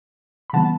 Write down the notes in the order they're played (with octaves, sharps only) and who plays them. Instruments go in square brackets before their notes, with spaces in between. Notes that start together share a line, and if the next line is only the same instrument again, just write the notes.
[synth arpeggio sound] B5
C#3 E3 G3 B3 F#5 A5